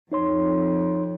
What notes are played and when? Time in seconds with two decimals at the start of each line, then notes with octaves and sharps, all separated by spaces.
0.12 F2 D#4 C#5 C6